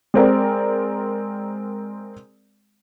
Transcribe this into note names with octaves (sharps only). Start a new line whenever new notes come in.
G#3 C4 A#4 D5